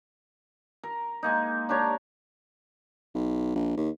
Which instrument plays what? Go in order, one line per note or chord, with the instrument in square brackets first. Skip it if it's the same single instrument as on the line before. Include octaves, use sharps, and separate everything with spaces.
[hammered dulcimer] A#4
G#3 A#3 D#4
D4 G4 A#4 C#5
[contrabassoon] B1
A#1
D#2